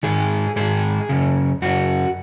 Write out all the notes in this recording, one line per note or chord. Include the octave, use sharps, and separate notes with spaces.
G#2 D#3 G#4
G#2 D#3 G#4
F#2 C#3
F#2 C#3 F#4